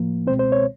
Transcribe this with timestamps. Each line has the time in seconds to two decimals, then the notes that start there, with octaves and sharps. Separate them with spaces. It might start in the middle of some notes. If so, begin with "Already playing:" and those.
Already playing: A2 F3 A#3
0.27 C#2 B2 G#3 C4 C5
0.39 C5
0.52 C#5